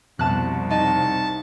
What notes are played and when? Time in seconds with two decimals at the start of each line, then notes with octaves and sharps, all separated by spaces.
0.19 C2 F2 B2 A5 F#6
0.70 D#4 A5